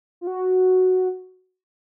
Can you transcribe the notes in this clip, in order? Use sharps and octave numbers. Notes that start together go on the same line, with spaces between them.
F4
F#4